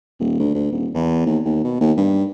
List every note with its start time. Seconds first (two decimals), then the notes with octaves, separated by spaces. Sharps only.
0.19 D#1
0.39 D2
0.55 D2
0.72 D#1
0.94 E2
1.26 D#2
1.45 D#2
1.64 B2
1.81 D#2
1.97 G2